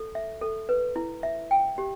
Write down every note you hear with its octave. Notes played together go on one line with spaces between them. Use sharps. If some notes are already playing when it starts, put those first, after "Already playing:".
Already playing: A4
E5
A4
B4
E4
E5
G5
G4